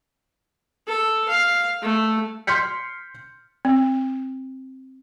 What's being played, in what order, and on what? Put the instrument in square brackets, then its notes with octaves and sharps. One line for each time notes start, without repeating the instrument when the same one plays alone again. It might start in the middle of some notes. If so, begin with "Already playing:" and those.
[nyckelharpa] A4
F5
A3
[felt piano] C6 F6 G6 B6 C#7
[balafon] C4